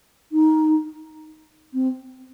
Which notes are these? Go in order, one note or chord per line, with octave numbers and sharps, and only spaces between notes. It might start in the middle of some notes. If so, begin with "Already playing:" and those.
D#4
C4